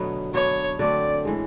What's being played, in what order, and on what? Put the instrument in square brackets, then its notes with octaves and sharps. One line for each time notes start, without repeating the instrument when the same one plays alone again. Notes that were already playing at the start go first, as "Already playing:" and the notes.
Already playing: [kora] B2 D3 F#3 A3 B3
[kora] F#3 B3 D4 [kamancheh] C#5
[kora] D3 F#3 A3 C4 [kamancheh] D5
[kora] A2 E3 G#3